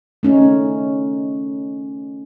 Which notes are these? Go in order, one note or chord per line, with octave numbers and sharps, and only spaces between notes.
A3 C#4 D#4